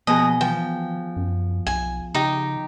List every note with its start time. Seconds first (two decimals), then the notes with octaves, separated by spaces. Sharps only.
0.07 B2 F3 G#4 D#5
0.41 E3 F3 G5
1.16 F#2
1.67 B1 G#5
2.15 C#3 D#4 G4